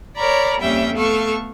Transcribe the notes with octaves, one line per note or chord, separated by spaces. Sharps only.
A#4 C#5 D5 A#5 B5
F2 G3 A#3 C#4 E5 G5
A3 B3 A4 F5 C#6